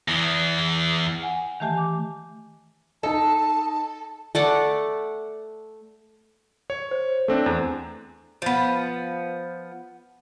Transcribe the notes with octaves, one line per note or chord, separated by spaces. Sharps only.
E2 E3
F#5 G#5
D#3 E3 A3 G4 G#5
D6
D#4 A4 D#5 A5
A3 D5 F#5
C#5
C5
A3 C4 D4 A4
E2
F3 B3